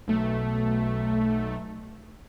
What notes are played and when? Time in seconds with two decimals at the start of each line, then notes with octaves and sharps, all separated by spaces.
0.08 B1 A3